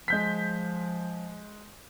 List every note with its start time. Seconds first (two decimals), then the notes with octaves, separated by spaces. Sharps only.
0.08 F3 G#3 G6 B6